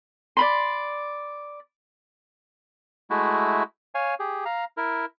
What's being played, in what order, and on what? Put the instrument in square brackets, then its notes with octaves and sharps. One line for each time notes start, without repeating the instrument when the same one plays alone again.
[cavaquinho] D5 B5 C6
[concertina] G#3 A3 E4 F#4
C#5 F5 G#5
G4 G#4
F5 A#5
E4 A#4